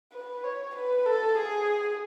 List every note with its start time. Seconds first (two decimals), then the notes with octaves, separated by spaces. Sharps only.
0.12 B4
0.44 C#5
0.75 B4
1.06 A4
1.37 G#4